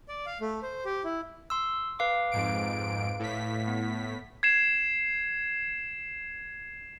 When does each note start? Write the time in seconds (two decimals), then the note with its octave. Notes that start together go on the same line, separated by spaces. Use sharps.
0.09 D5
0.26 F5
0.41 A3
0.63 C5
0.85 G4
1.04 E4
1.50 C6 E6
1.99 B4 F5 D6
2.31 F2 G#2 D7
3.19 A2 B6
3.68 B3
4.43 G#6 C7 E7